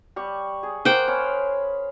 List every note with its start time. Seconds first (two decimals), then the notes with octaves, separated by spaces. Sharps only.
0.16 G3 C#6
0.63 G#4
0.85 A#3 C5 F#5 G5
1.08 C#4 F5 B5